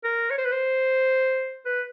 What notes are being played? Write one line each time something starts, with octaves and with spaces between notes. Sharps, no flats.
A#4
C#5
C5
B4
C5
B4